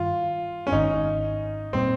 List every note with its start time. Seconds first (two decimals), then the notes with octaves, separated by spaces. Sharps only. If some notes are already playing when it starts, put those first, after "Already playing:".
Already playing: G2 D#3 G3 F4
0.67 C#4
0.72 G#1 G#2 D#3 D#4
1.73 A#2 G3 A#3 C4